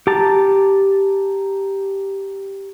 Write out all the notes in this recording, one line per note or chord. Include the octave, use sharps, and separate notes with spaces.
G4 A5 A#5